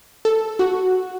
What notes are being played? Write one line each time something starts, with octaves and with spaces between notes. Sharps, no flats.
A4
F#4